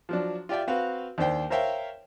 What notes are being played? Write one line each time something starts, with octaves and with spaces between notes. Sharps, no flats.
F3 F#3 D4
F4 G4 D5 E5 G5
C4 F#4 B4 F5
D#2 D4 C5 G5
A#4 C5 C#5 E5 F5 G5